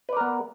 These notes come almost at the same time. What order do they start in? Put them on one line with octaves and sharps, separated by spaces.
B4 D5 A#4 B3